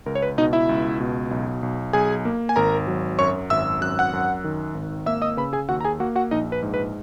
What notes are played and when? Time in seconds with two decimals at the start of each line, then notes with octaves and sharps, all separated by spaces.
0.06 C#2 A#4
0.15 C#5
0.22 B4
0.38 B2 D#4 D#5
0.53 E4 E5
0.69 C#2
1.00 B2
1.31 B1
1.63 B1
1.93 B1 G#4 G#5
2.25 A#3
2.49 G#5
2.56 G#1 A#4 A#5
2.87 F#3
3.19 F#2 C#5 C#6
3.50 G#1 E5 E6
3.81 F#2 F#6
3.99 F#5 F#6
4.13 F#2
4.44 D#3
4.75 G#1
5.06 A#3 E5 E6
5.22 D#5 D#6
5.37 C#3 B4 B5
5.53 G#4 G#5
5.68 D#2 F#4 F#5
5.80 A#5
5.85 G#4 G#5
6.00 A#3 F#4 F#5
6.16 F#4 F#5
6.31 A#1 D#4 D#5
6.52 B4
6.62 G#2
6.74 B4